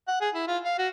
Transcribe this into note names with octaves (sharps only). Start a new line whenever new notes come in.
F#5
G#4
E4
F4
F5
F#4